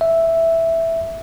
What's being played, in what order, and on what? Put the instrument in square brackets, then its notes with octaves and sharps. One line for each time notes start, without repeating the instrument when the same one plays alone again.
[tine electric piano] E5